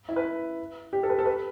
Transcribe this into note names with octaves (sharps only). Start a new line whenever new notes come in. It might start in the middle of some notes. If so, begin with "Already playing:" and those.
E4
B4
G4
A4
B4
A4
B4